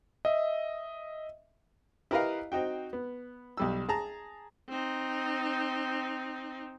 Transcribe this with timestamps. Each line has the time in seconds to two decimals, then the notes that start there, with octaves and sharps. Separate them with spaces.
0.25 D#5 E5
2.11 E4 G4 A#4 B4 D#5 F5
2.52 C4 D#4 F#4 G5
2.93 B3
3.57 B1 G3 E6
3.89 G#4 A5 A#5
4.69 C4 D#4